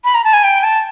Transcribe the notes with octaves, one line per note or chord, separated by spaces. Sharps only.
B5
A#5
A5
G#5
G5
A5